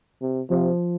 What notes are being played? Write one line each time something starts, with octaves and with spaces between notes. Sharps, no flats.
C3
C3 F3